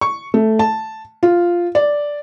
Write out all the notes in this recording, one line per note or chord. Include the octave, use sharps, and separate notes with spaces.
C#6
A3
A5
F4
D5